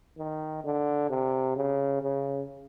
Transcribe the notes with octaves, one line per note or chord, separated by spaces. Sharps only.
D#3
D3
C3
C#3
C#3